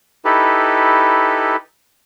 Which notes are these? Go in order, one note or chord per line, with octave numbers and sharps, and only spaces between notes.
D#4 E4 G4 A4 B4